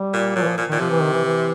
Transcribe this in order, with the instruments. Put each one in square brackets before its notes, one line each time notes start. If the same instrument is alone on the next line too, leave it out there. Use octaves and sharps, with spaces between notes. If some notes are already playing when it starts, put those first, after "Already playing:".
Already playing: [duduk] G3
[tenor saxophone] A#2
[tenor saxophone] A#2 [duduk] F#3
[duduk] E3
F3
[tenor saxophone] A#2
[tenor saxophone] A#2 [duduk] D#3
[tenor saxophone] C3 [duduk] F3
[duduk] E3
D#3
E3
E3